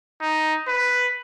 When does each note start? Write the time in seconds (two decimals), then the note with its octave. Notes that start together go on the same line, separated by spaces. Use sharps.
0.22 D#4
0.68 B4